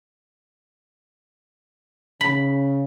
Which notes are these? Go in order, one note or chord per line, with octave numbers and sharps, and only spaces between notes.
C#3 B5